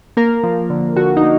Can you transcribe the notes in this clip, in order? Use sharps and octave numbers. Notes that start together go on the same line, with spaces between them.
A#3 A#4
F3
D3
D3 F#4
D#4
A#3